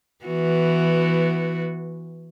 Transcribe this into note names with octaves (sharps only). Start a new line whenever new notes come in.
E3 B3 F#4